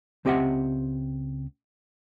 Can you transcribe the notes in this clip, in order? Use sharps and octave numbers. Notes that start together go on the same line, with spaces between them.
C#2 C4 G4 D#5 E5 F#5